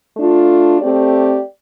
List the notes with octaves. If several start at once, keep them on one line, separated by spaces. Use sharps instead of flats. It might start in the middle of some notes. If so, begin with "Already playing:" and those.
A3 D4 F4
A3 C4 G4 D5